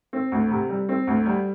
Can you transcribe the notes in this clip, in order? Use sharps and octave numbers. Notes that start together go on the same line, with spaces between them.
C4
D2
C3
G3
C4
D2
G3